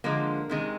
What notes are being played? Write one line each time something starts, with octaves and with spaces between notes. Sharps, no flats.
D3 F3 G#3 A#3
C3 D#3 G#3